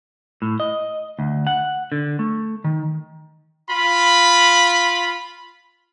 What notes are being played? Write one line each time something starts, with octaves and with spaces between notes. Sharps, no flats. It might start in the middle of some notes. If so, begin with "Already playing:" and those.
A2
D#5
D2
F#5
D3
A3
D#3
F4 B5